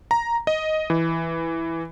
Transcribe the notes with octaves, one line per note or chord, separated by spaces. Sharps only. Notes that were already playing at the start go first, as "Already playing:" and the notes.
A#5
D#5
E3